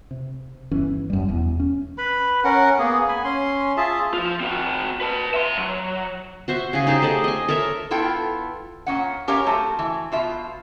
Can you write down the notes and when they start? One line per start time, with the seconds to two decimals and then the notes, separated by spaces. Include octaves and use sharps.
0.11 C3
0.71 G1 E3 C#4
1.10 F#2 G3
1.28 E1 E2
1.60 C#4
1.98 B4 B5
2.44 C#4 A#4 F#5
2.79 A#3 B3 G#4
3.08 G#5 B5
3.24 C#4 C6
3.77 F4 G#4 E5 A5
4.14 F3 F4
4.40 C4 F#4
5.01 B4 A5
5.34 E5 C6
5.57 F#3
6.48 F#4 C5 E5
6.73 C#3 G#4
6.87 D#4 G4 G#4 C5
7.02 A3 A4 D5 D#5
7.24 D#5 G#5
7.48 A4 A#4 C#5 E5
7.91 B3 E4 F4 A4 G5
8.86 A#2 C#4 F#5
9.28 C#4 G4 A#4 C#5 F5 A#5
9.47 A3 C4 F#4
9.79 E3
10.12 B2 F4 E5